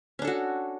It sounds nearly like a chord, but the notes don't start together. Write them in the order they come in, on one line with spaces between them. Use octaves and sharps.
C#4 D4 A4 F#4